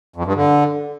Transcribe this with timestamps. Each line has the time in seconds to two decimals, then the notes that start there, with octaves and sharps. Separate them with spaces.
0.16 F2
0.26 G2
0.36 D3